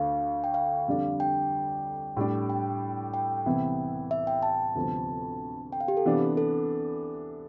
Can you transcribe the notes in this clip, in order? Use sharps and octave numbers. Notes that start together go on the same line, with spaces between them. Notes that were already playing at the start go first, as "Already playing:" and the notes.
Already playing: D2 D3 A3 D4 F5
G5
F5
F2 D3 G3 D4
G5
A2 G3 D4
G5
G5
C2 C3 E3 B3 E4
E5
G5
A5
D2 C3 F3 B3
G5
F5
G4
A4
C3 E3 B3 D4
A4